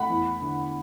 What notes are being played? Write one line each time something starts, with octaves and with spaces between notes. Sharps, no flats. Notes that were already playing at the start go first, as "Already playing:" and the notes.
Already playing: A3 F#5 B5
E2
D3